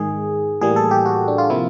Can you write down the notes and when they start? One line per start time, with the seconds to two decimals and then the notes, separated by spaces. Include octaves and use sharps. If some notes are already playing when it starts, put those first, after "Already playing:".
Already playing: G#2 D#3 G#3 G#4
0.61 A2 E3 G3 A#3 G#4
0.76 A4
0.91 G4
1.06 F#4
1.28 D4
1.38 F4
1.50 C3 F3 A#3 E4